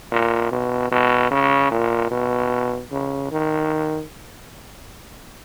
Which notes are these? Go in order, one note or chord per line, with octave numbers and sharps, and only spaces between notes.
A#2
B2
B2
C#3
A#2
B2
C#3
D#3